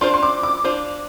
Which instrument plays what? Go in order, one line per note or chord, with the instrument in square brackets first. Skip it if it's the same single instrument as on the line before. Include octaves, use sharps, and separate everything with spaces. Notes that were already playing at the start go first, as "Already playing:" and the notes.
[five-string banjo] D4 F4 C5 [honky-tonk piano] C6
[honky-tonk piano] C6
D6
D6
[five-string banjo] D4 F4 C5